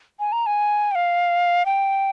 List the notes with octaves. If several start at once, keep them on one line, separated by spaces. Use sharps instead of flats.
G#5
A#5
G#5
G5
F5
G5